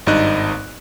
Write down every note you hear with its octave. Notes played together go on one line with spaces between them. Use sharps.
G#1 G2 D#4 D#5 F#6